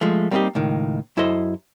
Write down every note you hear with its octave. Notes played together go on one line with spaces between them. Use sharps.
F3 G#3 A3
G3 A#3 C4 D4 D#4 G4
C#2 A2 D#3
F#2 E4 A4 C5 D#5